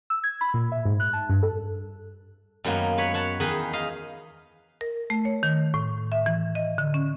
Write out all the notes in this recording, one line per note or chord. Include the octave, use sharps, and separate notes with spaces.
E6
G#6
B5
A#2
E5
G#2
F#6
A5
G2
A4
F#2 D#3 F#3 A#3 B3
B4 C#5 B5
C#5 F#5 A5 B5
E2 D#3 D#4 G#4 B4
D#5 F5
A#4
A3
C#5
D#3
A2
E5
E3
D#5
D3
C#4